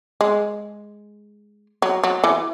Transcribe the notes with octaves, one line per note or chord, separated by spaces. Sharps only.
G#3
F#3
F#3
E3